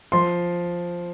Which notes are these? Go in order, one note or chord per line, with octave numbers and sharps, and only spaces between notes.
F3 C6